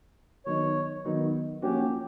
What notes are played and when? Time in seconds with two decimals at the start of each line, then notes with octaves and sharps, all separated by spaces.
0.46 D#3 F#3 B3 D#4 C#5
1.05 D#3 F#3 B3 D#4
1.62 F3 A#3 C#4 F#4 G4